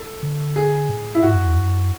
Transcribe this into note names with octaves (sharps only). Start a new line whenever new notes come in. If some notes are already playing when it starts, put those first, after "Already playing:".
Already playing: A4
D3
G#4
A2
E4
G#2 F#4
F#2
E2
F#2